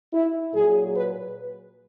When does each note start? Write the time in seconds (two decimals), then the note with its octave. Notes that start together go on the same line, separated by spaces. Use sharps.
0.13 E4
0.55 A#2 F#3 G#4
0.95 B4